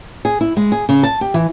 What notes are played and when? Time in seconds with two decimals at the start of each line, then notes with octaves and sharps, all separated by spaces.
0.25 G#4
0.41 E4
0.57 G#3
0.72 G#4
0.89 C#3
1.03 A5
1.21 G4
1.34 E3